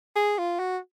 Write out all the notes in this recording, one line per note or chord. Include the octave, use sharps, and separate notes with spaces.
G#4
F4
F#4